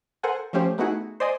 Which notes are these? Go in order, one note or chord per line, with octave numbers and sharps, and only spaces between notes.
A4 A#4 C5 F#5 G#5
F3 A3 C#4 G4 C5
A3 B3 D#4 E4 F#4 G#4
C5 D5 D#5 G#5 D#6